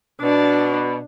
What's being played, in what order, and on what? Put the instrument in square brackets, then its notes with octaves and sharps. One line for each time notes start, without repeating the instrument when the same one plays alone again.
[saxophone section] B2 [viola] D4